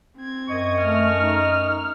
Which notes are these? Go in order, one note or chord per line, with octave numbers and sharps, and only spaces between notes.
C4 G#6
F#2 D#5 C#6
A3 F6
D#4